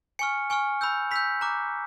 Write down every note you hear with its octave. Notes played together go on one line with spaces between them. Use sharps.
G#5 C#6 F6 C#7
G#5 C#6 F6
B5 E6 G6
B5 E6 G6 B6
A#5 D6 F#6